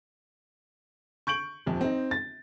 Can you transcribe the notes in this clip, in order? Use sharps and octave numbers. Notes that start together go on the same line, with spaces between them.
C#6 G6 D7 F#7
D#1 F2
C4 D#4
A6